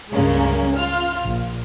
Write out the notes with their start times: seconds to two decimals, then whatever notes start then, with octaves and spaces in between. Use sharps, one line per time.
0.11 C#2 G2 C#3 G#3 A#3 C#4
0.75 F4 F6
1.22 A#1